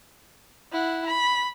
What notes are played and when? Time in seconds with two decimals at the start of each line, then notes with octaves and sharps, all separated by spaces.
0.72 E4 F#5
1.06 B5